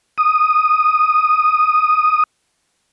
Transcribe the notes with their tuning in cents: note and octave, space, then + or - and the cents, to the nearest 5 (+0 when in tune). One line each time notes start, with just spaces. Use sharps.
D#6 -5